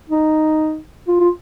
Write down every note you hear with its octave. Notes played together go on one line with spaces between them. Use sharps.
D#4
F4
F4